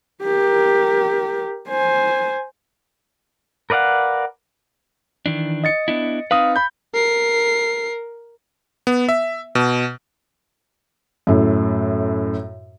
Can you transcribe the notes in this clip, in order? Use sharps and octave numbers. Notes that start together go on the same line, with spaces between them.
G4 A#4
C5 G#5
A#4 B4 D5 F5 F#5
D#3 E3 D4
D#5 A6 C#7
B3 D4 E4
C4 D#4 B4 F5 D#6
B5 G6
A#4 C7
B3
E5
B2
F#2 A2